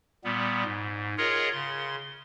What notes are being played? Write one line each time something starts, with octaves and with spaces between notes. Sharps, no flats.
A#2 G3 B3
G#2
F4 G#4 A#4 C#5 D#5 F#5
C#3 C6